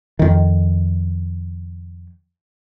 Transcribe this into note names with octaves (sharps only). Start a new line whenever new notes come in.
F2 D#3